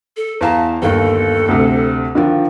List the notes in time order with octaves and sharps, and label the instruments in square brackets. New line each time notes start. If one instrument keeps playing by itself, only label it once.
[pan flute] A4
[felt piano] E2 F5 A#5 [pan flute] A5
[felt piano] G1 D#2 [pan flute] A4
[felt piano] D2 C3
D3 D#3 F3